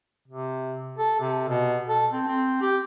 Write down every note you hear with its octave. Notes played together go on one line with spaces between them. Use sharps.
C3
A4
C3
B2
A4
C4
C4
G4